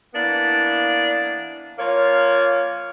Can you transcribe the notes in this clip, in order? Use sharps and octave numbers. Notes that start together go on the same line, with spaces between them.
E3 A#3 B3 D4
F3 A#3 C#5